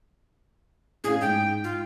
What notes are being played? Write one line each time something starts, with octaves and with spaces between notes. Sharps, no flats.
A2 C#4 G#4 F5
G#2 G5
F4